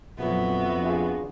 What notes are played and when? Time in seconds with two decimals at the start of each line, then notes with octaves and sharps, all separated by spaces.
0.19 A#1 F2 F#3 B3 F#4 E5
0.82 D4 F4 G#4